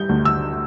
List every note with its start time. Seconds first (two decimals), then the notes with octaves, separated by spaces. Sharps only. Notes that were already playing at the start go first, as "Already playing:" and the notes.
Already playing: G3 G6
0.09 D2
0.25 E6